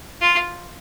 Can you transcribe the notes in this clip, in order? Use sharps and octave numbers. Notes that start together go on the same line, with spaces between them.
F4